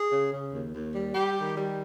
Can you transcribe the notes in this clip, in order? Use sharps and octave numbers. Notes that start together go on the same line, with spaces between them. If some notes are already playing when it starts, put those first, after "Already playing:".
Already playing: G#4
C#3
C#3
D#2
D#2
G3
G3 G4
D#3
G3